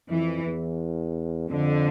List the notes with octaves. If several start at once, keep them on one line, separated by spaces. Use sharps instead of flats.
F2 E3
E2
F2 D3